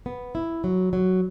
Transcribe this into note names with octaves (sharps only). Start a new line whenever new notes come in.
B3
E4
F#3
F#3